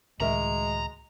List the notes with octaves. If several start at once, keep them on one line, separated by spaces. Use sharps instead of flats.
C#2 A2 D#3 G#3 F#4 A#4 E5 A#5